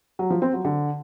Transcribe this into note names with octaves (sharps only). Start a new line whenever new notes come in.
F#3
F3
C4
F#3
D3